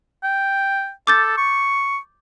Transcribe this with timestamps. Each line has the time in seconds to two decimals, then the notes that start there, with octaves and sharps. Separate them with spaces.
0.23 G5
1.07 A4 D6 G6 A6
1.38 C#6